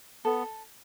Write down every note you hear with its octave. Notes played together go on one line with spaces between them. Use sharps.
B3 A4